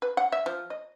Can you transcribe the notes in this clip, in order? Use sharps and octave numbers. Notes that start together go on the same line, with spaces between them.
B4
F#5
E5
F3
D#5